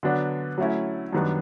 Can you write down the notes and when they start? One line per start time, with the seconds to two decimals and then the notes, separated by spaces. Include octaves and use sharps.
0.03 D3 F#3 B3 D4
0.58 F#3 A3 C#4 E4
1.13 F#2 D#3 G3 B3 D4